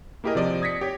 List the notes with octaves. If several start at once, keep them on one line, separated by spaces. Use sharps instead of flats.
A#3 E4 G4 G#4 A#4 D#5
C3 F3 D5 D#5
D#6 G#6 A#6 B6 C#7
G4 C#5 G5